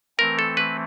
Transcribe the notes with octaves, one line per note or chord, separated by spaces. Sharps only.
E3 A3 C4 A#4
A4
B4